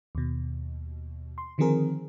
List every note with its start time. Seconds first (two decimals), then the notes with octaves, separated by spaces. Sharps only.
0.15 D#2 B2
1.38 C6
1.58 D3 D#3 F3 C4 G#4 A#4